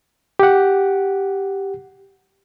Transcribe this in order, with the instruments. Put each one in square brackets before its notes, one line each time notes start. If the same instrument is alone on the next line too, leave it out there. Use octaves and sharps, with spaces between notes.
[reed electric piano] G4 F#5